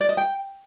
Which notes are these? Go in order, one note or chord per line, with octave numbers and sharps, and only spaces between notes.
D5
D#5
G5